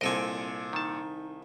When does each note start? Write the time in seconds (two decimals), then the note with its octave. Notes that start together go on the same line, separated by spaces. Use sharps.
0.01 C2 A#2 C4 A4 D#5 G#5 D7
0.73 D#3 D#4 A5